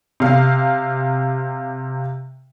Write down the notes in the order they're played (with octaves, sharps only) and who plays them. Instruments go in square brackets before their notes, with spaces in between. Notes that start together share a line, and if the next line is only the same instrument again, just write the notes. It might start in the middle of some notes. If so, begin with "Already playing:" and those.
[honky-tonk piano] C3 F5